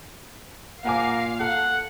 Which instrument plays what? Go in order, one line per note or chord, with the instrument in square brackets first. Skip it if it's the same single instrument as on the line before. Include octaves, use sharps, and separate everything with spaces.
[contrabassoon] A#2 [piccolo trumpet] A#4 [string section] F5 [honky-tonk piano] F#5 G#5 D6
[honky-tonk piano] A4 [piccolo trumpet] F#5